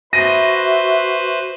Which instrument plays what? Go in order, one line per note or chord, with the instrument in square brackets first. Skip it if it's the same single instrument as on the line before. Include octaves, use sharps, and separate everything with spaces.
[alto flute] F#4 [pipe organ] B4 C5 [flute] E5 [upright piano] A#6 D#7